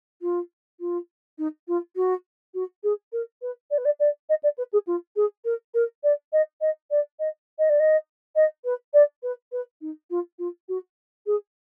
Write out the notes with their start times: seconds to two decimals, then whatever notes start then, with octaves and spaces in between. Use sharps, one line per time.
0.22 F4
0.80 F4
1.38 D#4
1.68 F4
1.96 F#4
2.54 F#4
2.83 G#4
3.13 A#4
3.42 B4
3.71 D5
3.78 B4
3.85 D5
4.00 D5
4.29 D#5
4.43 D5
4.58 B4
4.73 G#4
4.87 F4
5.16 G#4
5.45 A#4
5.74 A#4
6.03 D5
6.33 D#5
6.61 D#5
6.91 D5
7.19 D#5
7.59 D#5
7.69 D5
7.80 D#5
8.36 D#5
8.65 B4
8.94 D5
9.23 B4
9.52 B4
9.81 D#4
10.10 F4
10.39 F4
10.69 F#4
11.26 G#4